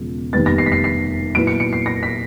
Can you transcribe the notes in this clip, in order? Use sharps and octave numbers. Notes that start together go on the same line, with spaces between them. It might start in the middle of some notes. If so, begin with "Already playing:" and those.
Already playing: E1 C#3 F3 G#3
F1 D#2 D#3 G3 B3 A6
A#6
C7
B6
C7
C7
A#2 F#3 B3 E4 D7
C#7
C#7
C7
A#6
B6